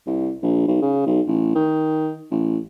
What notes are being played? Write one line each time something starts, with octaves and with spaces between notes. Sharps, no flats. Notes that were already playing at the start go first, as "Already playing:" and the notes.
C2
A#1
B1
C#3
B1
A1
D#3
A1